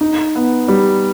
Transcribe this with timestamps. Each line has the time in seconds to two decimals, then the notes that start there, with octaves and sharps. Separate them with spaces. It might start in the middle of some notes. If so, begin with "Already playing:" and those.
0.01 D#4
0.36 B3
0.68 G3